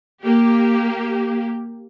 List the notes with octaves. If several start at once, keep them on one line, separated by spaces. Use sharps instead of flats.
A#3 G4